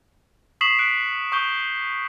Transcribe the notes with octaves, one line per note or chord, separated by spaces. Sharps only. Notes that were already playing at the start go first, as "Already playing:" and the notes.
C#6 D#6 B6 C7 E7 F#7
F#6 B6 C#7 D7 F#7
C#6 D#6 G6 G7